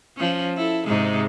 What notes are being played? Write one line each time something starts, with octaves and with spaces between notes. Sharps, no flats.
F3 C#4
E4 A4
G#2 C3 G#3